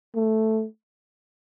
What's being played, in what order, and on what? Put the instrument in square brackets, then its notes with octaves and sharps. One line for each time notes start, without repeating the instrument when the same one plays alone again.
[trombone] A3